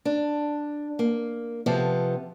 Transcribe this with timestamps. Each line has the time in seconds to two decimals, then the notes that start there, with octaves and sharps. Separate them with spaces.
0.05 D4
0.99 A#3
1.66 C3 F3 B3 A4